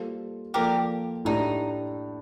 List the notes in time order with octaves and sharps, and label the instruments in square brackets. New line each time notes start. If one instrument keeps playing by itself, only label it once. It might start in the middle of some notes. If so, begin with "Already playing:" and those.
Already playing: [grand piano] G3 A#3 F4 A4 C5
[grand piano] F3 A#3 F4 A4 D5 [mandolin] G4 A#4
[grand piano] A2 A3 D4 G4 [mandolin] D#4